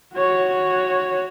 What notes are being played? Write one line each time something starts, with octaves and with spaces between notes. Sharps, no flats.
F#4 C#5